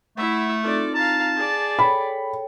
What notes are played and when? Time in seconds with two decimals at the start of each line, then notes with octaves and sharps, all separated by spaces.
0.17 A3 E4 E5 F#5 B5
0.63 C4 D#4 F4 A4 D5
0.95 F5 A5 A#5
1.37 G#4 D5
1.79 A4 C#5 G5 B5